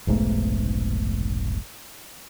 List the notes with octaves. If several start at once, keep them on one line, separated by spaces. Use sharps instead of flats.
F1 B1 G#2 A3